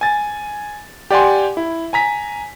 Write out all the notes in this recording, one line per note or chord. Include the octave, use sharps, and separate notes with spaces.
G#5 A6
G4 D5 F#5 G#5 C6
E4
G#5 A#5 B6